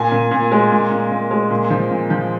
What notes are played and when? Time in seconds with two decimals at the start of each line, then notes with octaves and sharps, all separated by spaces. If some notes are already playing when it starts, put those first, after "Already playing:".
Already playing: A#2 G#5
0.12 A#2
0.31 A#2
0.52 G#3
0.71 A#2
0.91 A#2
1.11 A#2
1.31 G#3
1.51 A#2
1.70 F3
1.91 A#2
2.10 F3